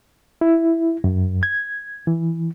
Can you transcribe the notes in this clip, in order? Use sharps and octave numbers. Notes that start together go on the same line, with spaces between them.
E4
F#2
G#6
E3